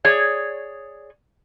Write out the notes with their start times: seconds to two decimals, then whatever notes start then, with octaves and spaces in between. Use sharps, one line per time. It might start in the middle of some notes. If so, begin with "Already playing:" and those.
0.04 G#4 C#5 D5